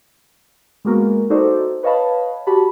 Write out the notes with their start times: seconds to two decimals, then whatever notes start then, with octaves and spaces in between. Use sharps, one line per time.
0.85 G#3 A#3 B3 F#4 A#4
1.30 D#4 F#4 A4 C5 D5
1.83 B4 C#5 D#5 F5 A5 B5
2.47 F#4 G4 A5 B5